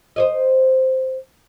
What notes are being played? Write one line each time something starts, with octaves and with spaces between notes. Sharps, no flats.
C5 C#5 D#5